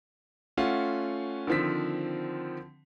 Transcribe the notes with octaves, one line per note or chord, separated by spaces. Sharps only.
A3 C#4 F4 F#5
D3 D#3 F3 C4 B6